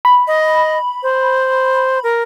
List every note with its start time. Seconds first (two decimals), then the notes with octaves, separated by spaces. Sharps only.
0.05 B5
0.27 D#5
1.03 C5
2.03 A#4